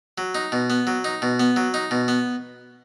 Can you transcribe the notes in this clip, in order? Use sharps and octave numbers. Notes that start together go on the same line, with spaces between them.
F#3
D#4
B2
B3
F#3
D#4
B2
B3
F#3
D#4
B2
B3